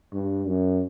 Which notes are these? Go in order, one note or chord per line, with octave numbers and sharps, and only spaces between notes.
G2
F#2